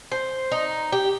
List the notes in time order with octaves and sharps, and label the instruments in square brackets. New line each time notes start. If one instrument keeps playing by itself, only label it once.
[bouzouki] C5
D#4
G4